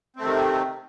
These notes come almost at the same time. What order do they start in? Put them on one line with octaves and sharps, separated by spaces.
C4 A3 C3 D#3